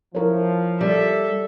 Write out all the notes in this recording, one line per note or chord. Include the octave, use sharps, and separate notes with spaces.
F3 E4 A#4 C#5
G3 A4 E5